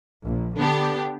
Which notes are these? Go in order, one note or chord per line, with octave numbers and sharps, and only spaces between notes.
A#1
D3 B3 D4 G4